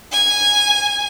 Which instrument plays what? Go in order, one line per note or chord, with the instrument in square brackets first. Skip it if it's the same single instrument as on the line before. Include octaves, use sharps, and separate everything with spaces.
[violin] G#5